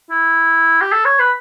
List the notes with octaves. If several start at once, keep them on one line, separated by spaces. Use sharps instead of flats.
E4
G4
A4
C#5
B4